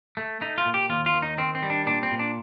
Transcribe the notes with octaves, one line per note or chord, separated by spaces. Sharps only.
A3
A3 D#4
F4
A#2
G4
D#2 F4
F4
D#3
D#4
D#3 C4
C4
G3
D4
A#2 D4
C4
A#2
D4